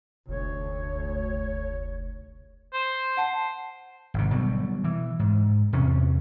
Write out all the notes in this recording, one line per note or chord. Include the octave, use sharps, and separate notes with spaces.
F1 D2 C#5
C5
F#5 A5 C7
G#1 C3
B2 D3 F#3 G3
E3
G#2
E2 C3 C#4